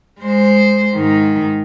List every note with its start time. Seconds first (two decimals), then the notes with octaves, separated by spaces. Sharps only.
0.21 G#3 C5
0.96 G#2 D#3